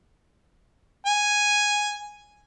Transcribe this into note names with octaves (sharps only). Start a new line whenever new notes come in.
G#5